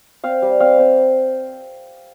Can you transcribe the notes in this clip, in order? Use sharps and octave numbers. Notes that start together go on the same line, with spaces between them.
C4 F5
G3
C4 F5
C4